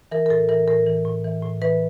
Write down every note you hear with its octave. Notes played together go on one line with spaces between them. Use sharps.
E3 A#4
A#4
A2 A4
E3 A#4
A2 A#4
E3
A2
E3
A2
E3 B4